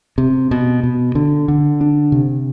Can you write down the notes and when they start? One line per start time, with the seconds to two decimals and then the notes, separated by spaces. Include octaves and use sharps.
0.18 C3
0.51 B2
0.83 B2
1.15 D3
1.48 D3
1.81 D4
2.12 C3